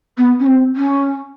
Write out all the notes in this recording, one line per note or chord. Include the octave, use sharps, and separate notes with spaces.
B3
C#4
C4
C#4